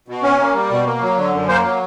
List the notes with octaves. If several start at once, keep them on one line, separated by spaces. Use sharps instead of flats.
B2
C#4
A#3
G3
B2
A#3
F#3
D3
F#2
A#3 C5
F#3